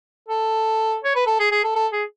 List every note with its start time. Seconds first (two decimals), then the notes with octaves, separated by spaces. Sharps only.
0.29 A4
1.04 C#5
1.15 B4
1.27 A4
1.39 G#4
1.51 G#4
1.63 A4
1.76 A4
1.92 G#4